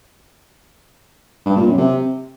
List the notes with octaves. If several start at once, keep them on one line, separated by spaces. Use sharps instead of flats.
G2
A#2
F#2
C3